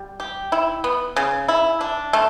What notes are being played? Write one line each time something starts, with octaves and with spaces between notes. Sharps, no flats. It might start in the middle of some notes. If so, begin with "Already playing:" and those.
Already playing: G3
G4
E4
B3
C#3
E4
D4
A3